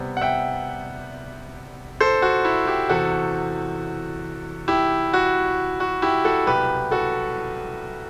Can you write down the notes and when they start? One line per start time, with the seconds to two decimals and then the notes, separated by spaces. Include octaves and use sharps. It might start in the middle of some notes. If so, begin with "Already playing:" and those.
Already playing: C3 G3 B3
0.17 F#5
0.21 E5 G5
2.01 A4 C5
2.22 F#4
2.45 E4
2.67 E4 G4
2.89 E2 C3 E3 F#4 A4
4.68 E4 G4
5.13 F#4
5.80 F#4
6.02 E4 G4
6.24 F#4 A4
6.46 C2 B2 F#3 G4 B4
6.91 F#4 A4